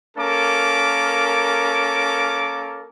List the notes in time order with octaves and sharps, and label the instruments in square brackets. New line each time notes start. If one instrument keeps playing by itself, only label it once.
[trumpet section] A#3 C#4 A4 A#4 D6